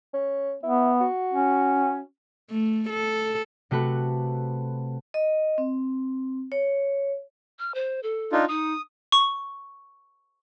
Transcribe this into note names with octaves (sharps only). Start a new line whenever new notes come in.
C#4
B3 E4
F#4
C#4
A3
A4
C3 A3 F#4 B4
D#5
C4
C#5
F6
C5
A4
D4 D#4 F4
D#4 D#6
C#6